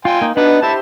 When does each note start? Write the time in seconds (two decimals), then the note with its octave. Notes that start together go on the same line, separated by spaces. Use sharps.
0.05 F4 G5 G#5 C6
0.21 A#3 D#4
0.37 B3 D4 D#4 B5
0.63 E4 G4 C5 E5 A5